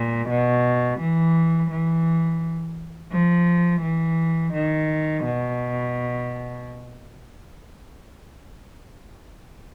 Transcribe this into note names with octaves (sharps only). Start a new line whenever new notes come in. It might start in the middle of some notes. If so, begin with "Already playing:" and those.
Already playing: A#2
B2
E3
E3
F3
E3
D#3
B2